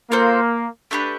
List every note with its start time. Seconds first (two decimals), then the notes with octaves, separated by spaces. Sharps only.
0.11 A#3 F4 A4 C5
0.91 A3 D4 G4 B4